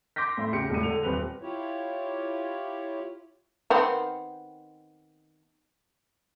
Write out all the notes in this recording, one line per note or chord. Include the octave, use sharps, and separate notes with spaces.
C6 D6 G6 A#6 B6
A2 E5 C6
E2 C#3 G4 C#7 D7
E1 A2 D#7
D3 F7
D#1 C4 B4 F7
E4 F4 G4 C#5
D#3 B3 C4